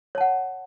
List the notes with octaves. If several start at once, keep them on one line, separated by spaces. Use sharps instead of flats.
C#5 F#5 A5